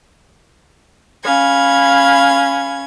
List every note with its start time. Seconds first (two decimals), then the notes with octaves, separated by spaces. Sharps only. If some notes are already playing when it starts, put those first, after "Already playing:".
1.25 C#4 F5 B5 G#6